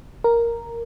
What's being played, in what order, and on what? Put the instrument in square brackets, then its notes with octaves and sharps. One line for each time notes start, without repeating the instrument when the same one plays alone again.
[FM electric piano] A#4